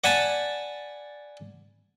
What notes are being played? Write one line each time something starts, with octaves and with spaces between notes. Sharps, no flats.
D5 F#5 G#5 A5 B5